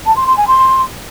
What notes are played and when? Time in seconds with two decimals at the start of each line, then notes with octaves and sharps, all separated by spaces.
0.06 A5
0.16 C6
0.27 C6
0.37 G#5
0.48 C6